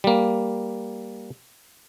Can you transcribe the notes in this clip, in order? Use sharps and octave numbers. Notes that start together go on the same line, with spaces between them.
G3 A#3